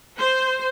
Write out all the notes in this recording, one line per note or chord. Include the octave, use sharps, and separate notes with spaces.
C5